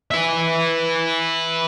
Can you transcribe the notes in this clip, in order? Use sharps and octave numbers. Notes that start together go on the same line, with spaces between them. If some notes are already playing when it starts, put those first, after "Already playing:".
B4 E5